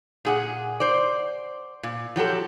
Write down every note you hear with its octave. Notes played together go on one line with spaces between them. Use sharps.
A#2 G#4 F#5
C5 D5
A#2
F3 F#3 G4 A4